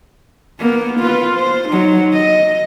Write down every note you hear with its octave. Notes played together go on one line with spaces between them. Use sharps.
A#3 B3
F4 B4
C5
F#3 D#4
D#5